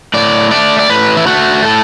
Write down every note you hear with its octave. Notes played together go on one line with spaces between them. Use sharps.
A2 D5
A3 D5
D5
A2 B4
E4
A3 F#4
A2 A4